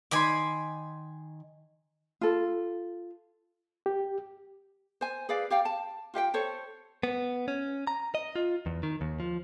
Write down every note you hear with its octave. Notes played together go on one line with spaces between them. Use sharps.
D#3 G#5 B5 C6 D6
F4 A4
G4
C5 G#5
G#4 B4 D5 F5
G4 F5 G5
A5
F4 G4 F5 G5
A4 C5 C#5
B3
C#4
A#5
D#5
F4
E2
D#3
D#2
F3